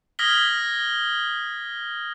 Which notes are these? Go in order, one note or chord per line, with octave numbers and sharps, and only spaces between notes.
D#6 F6 G#6 A#6 B6 G7